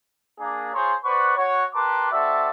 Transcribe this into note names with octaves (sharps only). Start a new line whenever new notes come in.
A#3 D4 G#4
F4 G#4 C5 C#5 A#5 C6
B4 C5 D5 F#5 C#6
F#4 C#5
G4 A#4 B4 A5 C6 D6
C4 F#4 A4 D5 E5